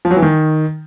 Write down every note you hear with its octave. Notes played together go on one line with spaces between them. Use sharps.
F3
F#3
E3
D#3